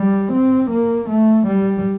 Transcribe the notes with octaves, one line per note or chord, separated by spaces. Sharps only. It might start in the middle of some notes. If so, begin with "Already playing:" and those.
Already playing: G3
C4
A#3
A3
G3